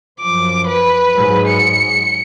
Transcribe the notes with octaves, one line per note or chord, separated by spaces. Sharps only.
F#2 F3 D6
B4
G#2 F#3 G#3
C#7